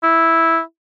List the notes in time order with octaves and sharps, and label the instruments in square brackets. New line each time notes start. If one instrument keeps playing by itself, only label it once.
[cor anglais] E4